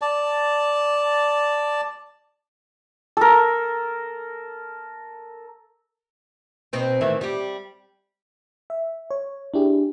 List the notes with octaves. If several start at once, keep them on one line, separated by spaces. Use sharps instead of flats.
D5 A5
A4 A#4
B2 C4 D#4
A2 D#3 E3
G3 G4
E5
C#5
D4 E4 G4 G#4